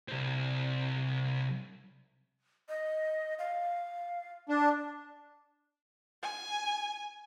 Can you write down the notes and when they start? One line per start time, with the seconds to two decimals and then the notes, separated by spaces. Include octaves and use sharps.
0.08 C2 C4
2.69 D#5
3.39 F5
4.49 D4
6.23 G#5